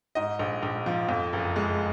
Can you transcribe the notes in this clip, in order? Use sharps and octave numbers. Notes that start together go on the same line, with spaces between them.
G#2 D#5
A#1
A#1
F3
F2
F#1
G#3